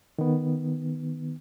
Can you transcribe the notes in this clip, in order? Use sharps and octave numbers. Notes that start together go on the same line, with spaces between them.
D#3 B3